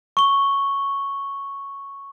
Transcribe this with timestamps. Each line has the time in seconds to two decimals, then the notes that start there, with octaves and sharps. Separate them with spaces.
0.17 C#6 G7